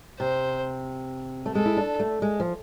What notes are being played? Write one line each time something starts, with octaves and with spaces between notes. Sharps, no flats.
C3 C5
A3
G#3 A4
E4
D4
A3
G#3
F3